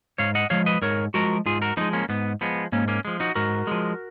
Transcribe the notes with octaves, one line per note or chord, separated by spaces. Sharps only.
G#2 C#5 F5
D#5 F#5
F3 G#3 C#5 F5
B4 D#5
G#2 A#4 C#5
F3 G#3 F#4 A#4
G#2 F4 G#4
F#4 A#4
F3 G#3 B3 D#4
A#3 C#4
G#2 B3
F3 G#3 B3
G#2 A#3 C#4
A#3 C#4
F3 G#3
D#4 F#4
G#2 F#4 A#4
F3 G#3